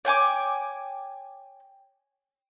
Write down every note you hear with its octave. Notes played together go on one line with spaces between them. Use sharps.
C#5 G5 G#5 D6